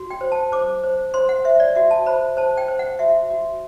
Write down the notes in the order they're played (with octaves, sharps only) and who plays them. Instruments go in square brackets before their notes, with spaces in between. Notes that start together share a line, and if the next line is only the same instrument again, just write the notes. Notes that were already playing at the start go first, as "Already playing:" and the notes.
Already playing: [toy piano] F#4
G5
C5
A5
C5 D6
C5
C5 C6
F#5
C5 E5
D5
F#4 E5
A5
C5 B5
C5 A5
G5
C5
F#5
F#4 E5
F#4